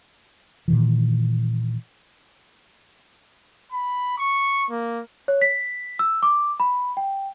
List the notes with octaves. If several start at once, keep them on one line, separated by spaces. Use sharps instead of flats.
A#2 D#3 E3
B5
C#6
A#3
C#5
B6
E6
D6
B5
G5